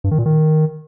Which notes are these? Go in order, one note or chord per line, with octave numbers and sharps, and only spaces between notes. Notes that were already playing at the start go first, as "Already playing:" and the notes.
G2
D#3
A#2
D#3